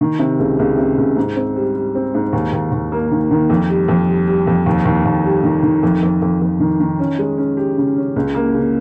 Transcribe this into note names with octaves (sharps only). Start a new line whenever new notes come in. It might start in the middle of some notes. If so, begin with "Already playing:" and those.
D#3
C3
C#2
C#2
C3
C#2
G#2
C4
G3
G3
C4
G#2
D#2
D#2
D#2
A#3
D#3
D#3
F2
G3
F2
G3
G3
F2
D#2
D#2
D#2
G3
D#3
D#3
F2
F2
F2
F2
D#3
D#3
C#4
G#3
C#4
G4
C#3
C#4
C#2
A#3
C#3